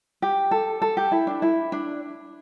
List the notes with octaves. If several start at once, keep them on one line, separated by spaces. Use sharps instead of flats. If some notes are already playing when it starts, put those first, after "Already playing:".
G4
A4
A4
G4
E4
D4
E4
D4